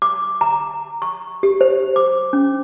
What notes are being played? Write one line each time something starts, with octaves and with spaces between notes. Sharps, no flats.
D6
A#5
C#6
G4
C5
D6
C#4